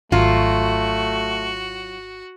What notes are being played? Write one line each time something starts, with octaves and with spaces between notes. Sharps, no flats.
G#1 F#3 A3 F4 F#4